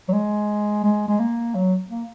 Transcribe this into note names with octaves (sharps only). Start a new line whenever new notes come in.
F#3
G#3
G#3
G#3
A#3
F#3
A#3